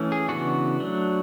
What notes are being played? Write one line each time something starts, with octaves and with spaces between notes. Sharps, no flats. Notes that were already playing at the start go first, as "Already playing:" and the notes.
Already playing: E3 A3 C#4
G#4
C#3 E3 B3 D4 F#4
F#3 A3 D4